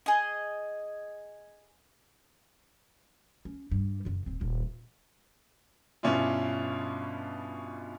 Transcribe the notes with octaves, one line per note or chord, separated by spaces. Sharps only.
G#4 D#5
C#4
G2 G3
F#2 C#3
D#1 C4
D#1 E2
G2 B2 C#4 D4 E4 F4